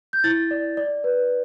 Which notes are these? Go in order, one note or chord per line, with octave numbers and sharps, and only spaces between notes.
G6
E4 A6
D5
D5
B4